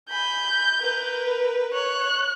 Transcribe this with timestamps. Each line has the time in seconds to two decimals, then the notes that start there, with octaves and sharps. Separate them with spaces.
0.10 G#5 B5 G6
0.81 A#4 B4
1.74 C#5 F#6